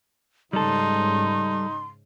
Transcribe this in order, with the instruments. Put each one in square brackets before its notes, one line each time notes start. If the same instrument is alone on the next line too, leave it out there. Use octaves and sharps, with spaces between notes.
[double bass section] G#2 C#3 G#3 [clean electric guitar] G3 A4 [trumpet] D#4 [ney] C6